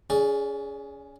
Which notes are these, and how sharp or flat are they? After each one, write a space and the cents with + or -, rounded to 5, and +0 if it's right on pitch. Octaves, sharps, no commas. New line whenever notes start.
C#4 +30 G#4 +0 D5 +0